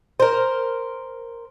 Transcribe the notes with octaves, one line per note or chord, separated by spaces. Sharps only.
A#4 C5